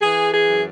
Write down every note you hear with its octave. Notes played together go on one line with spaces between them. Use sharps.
E3 G#4
G#4
F#2